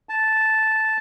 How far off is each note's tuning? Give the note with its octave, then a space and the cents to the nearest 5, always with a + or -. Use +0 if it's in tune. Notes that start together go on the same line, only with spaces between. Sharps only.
A5 -5